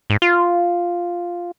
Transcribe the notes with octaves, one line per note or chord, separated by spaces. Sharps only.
G#2
F4